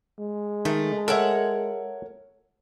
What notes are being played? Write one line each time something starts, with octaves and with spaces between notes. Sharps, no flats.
G#3
D#3 A3
A4 A#4 C#5 E5 F#5